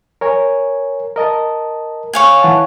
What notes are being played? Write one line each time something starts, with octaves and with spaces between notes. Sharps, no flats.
A#4 C#5 G#5
A#4 D#5 A5
C#5 F5 G#5
E3 F#5 A5